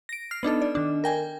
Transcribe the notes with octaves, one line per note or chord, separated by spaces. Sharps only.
A#6 D7
F6 C7
B3 D4 D#4 A4
D5
D#3 D4
A#4 G5 G#5